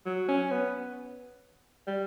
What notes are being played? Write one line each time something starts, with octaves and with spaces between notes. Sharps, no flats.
F#3
C#4
B3
G3